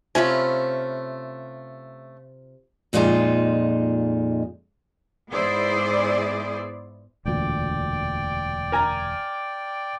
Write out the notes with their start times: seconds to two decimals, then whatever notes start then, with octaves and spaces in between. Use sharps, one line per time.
0.15 C3 A3 C#4 F4 G#5 B5
2.93 F2 A#2 G#3 D#4 F4 A5
5.31 G#2 B3 E4 G#4 C5 D5
7.25 E1 D2 A#2 D5 G5
8.72 A#4 G#5 A#5